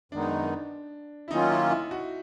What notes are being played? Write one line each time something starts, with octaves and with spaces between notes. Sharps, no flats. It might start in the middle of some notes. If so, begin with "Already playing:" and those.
F#2 D#3 G#3 B3 D4 D#4
E4
D#3 F#3 A#3 C#4 D#4 F4
E4
E4
F#4